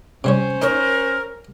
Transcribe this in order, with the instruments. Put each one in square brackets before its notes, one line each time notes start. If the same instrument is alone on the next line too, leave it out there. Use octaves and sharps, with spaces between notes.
[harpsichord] C3 G3 C#5 [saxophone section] C#4 C5
[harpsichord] D#4 C#5 [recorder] A#4